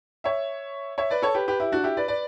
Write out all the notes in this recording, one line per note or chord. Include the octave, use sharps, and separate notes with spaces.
C#5 E5
C#5 E5
B4 D5
A4 C#5
G4 B4
G4 B4
E4 G4
D4 F#4
E4 G4
B4 D5
B4 D5